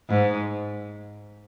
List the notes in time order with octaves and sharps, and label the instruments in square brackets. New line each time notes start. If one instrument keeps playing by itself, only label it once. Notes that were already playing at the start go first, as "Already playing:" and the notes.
[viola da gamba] G#2